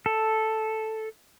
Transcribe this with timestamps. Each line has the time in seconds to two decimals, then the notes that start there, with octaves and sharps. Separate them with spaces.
0.06 A4